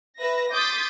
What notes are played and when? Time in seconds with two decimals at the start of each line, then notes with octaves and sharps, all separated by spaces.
0.17 B4 E5 A#6
0.52 C6 D6 D#6 G6 A6 B6